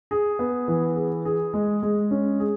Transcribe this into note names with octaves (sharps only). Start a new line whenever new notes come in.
G#4
B3
E3
G#4
G#4
G#3
G#3
C#4
G#4